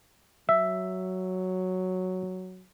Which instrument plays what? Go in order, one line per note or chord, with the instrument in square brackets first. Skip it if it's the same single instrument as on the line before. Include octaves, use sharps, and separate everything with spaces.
[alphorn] F#3 [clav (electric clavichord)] E5